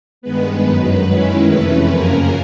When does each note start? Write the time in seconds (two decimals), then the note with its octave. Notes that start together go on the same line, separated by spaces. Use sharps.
0.22 G2 D#3 G#3 B3 B4
0.64 F#2 D#3 F#3
1.06 D#3 G#3 C#4 E4
1.48 F2 C3 E3 A3 C#4 B4
1.90 F#2 C#3 F3 A#3 C#4 A#4